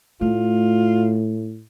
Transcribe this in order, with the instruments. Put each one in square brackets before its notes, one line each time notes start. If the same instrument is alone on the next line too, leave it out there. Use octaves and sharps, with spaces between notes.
[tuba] A2 [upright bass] A3 [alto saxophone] F4